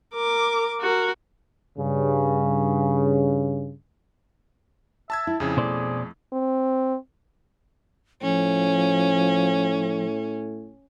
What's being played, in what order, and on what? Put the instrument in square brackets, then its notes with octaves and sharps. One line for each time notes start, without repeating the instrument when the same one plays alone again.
[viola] A#4 D6
F#4 A#4
[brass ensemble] G2 C#3
[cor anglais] E5 [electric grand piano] A5 E6 G#6
[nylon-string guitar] E4
[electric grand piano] F2 C#3 [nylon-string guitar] C#4 [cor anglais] G#4
[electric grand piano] F2 A3 [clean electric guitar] B2 C5 D5
[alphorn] C4
[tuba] A2 [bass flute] F3 [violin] C#4